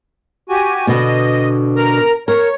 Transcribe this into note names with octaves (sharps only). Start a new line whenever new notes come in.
F#4 G4 G#5
B2 D3 B3 D#5
A#4 A#5
A#4 C#5